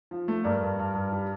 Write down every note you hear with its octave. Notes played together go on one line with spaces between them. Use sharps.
F3
A3
G2 A#4 D5
G2
G2
G2
G3